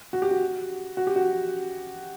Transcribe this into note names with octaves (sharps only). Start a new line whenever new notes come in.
F#4
G4
F#4
F#4
G4
F#4